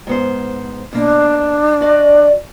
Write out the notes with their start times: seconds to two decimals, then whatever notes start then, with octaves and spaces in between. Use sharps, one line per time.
0.07 G#2 B3 C5
0.93 B2 A#3 D4
1.81 F#4 D5 D#5